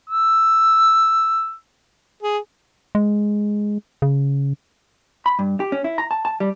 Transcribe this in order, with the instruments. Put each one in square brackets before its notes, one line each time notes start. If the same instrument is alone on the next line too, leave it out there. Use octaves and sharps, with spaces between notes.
[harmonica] E6
G#4
[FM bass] G#3
C#3
[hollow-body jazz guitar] B5
G2
G4
C#4
E4
A#5
A5
A5
G3